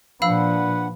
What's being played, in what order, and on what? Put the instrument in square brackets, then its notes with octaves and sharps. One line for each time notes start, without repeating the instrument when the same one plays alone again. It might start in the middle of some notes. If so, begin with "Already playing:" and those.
[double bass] A#2 F3 [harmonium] D4 F#5 [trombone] B4 [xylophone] F5 B5 E6